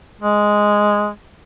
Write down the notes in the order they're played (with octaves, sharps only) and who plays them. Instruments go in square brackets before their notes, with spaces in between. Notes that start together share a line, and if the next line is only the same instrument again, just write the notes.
[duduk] G#3